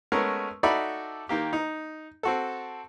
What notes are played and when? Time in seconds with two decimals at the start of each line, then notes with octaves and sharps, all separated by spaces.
0.12 G#3 A3 B3 C#4 A#4
0.63 D#4 F#4 A4 D5 E5 B5
1.29 D#3 A#3 G4
1.53 D#4
2.23 C4 F#4 A4